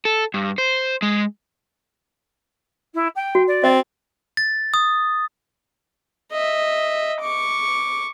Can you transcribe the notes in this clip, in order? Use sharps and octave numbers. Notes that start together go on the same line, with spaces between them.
A4
G2
C5
G#3
E4
G5
F#4
D5
C4 D#5
A6
D#6
D#5 E5
C#6 D6